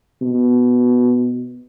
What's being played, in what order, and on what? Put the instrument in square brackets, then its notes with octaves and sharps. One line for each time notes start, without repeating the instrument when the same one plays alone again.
[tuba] B2